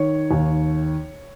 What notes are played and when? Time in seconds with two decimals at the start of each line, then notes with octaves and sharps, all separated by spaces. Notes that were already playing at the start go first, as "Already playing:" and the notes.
Already playing: D#3 C#5
0.31 D#2